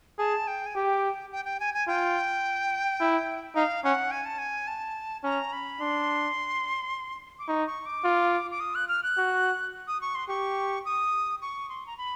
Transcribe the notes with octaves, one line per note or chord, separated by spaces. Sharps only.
G#4 A5
G5
G#5
G4 G5
G5
G5
G#5
G#5
F4 G5
E4
D#4 F5
C#4 F#5
G#5
A5
G#5
A5
C#4 A#5
B5
D4 C6
D6
D#4 C#6
C#6
D6
F4
D6
D#6
F#6
F6
F#6
F#4
D#6
C#6
C6
G4 C#6
D#6
C#6
C6
A#5
B5